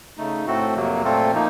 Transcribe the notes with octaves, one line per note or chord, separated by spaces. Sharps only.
C#3 A3 D#4
A2 A3 C4 F#4 A4
F2 C3 F#3 A#3
A#2 A3 C4 F4 A4
F3 A#3 D#4